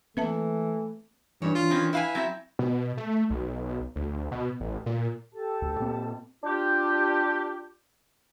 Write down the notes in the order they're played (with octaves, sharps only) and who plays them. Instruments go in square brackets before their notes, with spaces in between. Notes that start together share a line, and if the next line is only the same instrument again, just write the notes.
[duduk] E3 [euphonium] A3 [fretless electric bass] A#3 C4 [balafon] B4 E5 A5
[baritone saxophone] G2 [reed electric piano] E3 D4 [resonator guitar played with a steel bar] C#5
[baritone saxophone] F4
[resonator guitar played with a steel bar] D#3 C4 C#4
[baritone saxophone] E4 [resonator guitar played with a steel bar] B4 F5 G#5
[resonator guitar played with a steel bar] F#3 C4 E5
[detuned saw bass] B2
A3
B1
D2
B2
A1
A#2
[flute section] G4 A4 A5
[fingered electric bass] D2
A#2 A#3 C4
[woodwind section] D4 F4 G4